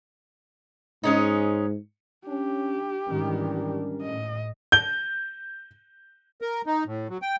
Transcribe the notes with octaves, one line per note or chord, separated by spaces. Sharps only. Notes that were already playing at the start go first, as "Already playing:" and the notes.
G#2 G#3 C#4 D#4
C#4 D4 G4
G#2 D#3 E3 G3 C#4 D4 A#4
A2 D#5
G6 G7
A#4
D#4
A2
F#3
G5